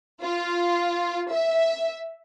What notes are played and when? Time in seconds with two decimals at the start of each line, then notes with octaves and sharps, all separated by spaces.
0.22 F4
1.32 E5